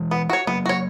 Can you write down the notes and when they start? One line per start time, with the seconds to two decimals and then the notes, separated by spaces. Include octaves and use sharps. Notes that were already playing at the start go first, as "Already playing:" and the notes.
Already playing: E3 G#3
0.11 B3
0.30 F#4 C#5
0.47 F#3 A#3 B3
0.66 F#4 C#5